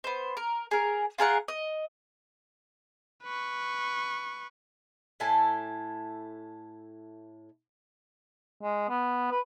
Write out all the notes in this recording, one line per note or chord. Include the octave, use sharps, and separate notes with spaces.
B3 C5
A#4
G#4 A#4
F4 G#4 A#4 F#5
D#5
B4 C#6
A2 E4 A4 G#5
G#3
B3
B4